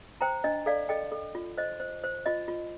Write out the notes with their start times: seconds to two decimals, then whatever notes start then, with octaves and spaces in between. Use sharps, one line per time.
0.21 C5 G5 A#5
0.44 D4 D#5
0.66 A4 D5 F5
0.89 A4 D#5 G5
1.12 A4
1.35 F4
1.58 C5 D#5
1.80 C5
2.04 C5
2.26 F4 D#5
2.48 F4